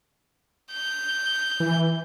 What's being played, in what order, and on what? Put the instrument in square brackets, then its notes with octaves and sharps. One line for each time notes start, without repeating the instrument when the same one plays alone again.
[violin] G6
[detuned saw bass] E3